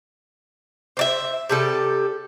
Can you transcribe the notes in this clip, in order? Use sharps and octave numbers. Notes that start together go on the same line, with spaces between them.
C5 D5 E5
C3 G3 A4